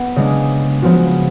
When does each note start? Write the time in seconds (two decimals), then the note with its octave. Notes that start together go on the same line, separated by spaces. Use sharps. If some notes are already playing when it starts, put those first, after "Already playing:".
Already playing: B3
0.16 C#3 G#3 D4
0.82 C#3 F3 B3 F#4